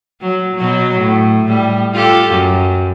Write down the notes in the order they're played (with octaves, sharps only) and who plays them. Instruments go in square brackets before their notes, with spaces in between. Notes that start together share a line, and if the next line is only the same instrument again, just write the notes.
[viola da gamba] F#3
B2 F#3
A2
A2 G3
F4 G4 A4
F#2